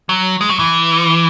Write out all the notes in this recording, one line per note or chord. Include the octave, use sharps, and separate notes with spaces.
F#3
G#3
F#3
E3